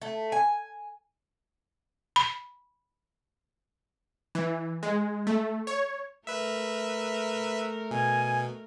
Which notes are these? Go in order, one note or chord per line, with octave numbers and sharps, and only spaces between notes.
A3
G#5
B5
E3
G#3
A3
C#5
A3 A#4 B4 E5
B2 G#5